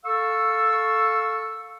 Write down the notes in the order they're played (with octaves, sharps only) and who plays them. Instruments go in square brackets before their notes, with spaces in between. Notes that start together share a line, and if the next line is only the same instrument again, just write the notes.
[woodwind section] A4 F5 C#6 E6